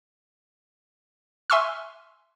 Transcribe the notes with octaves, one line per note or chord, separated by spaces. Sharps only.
E5 G#5 C6 C#6 E6 F6